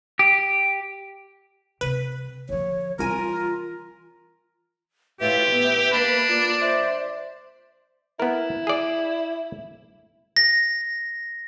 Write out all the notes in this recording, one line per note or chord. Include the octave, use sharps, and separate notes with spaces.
G4
C3 C4 B4
D3 F3 C#5
C2 E3 F4 A#4 G#5 D#7
A2 F4 G4 B4 E5
B3 E5
A#3 D4 B5
F4 D5
C5 E5
B3 E4 A#4
G#4 D5
A#6